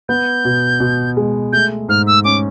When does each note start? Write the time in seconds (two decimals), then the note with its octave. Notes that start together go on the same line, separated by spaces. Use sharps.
0.09 B3 G6
0.45 B2
0.80 B2
1.17 G#3
1.53 A3 G6
1.89 G#2 F6
2.07 E6
2.24 C#4 D6